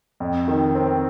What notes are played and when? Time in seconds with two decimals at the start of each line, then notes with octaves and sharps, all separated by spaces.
0.20 F2
0.48 D#3
0.75 C4